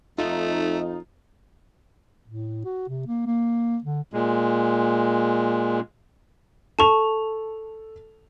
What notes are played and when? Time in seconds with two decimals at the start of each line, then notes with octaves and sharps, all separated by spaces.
0.18 F2 A3 D#4 F4
2.28 A2
2.65 F#4
2.88 C3
3.07 A#3
3.26 A#3
3.84 D3
4.13 A#2 G#3
6.79 A4 A5 C#6 F7